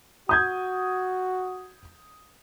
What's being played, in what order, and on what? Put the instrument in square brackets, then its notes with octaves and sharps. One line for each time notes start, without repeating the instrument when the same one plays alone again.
[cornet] F#4 [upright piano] D#6 G6 G#6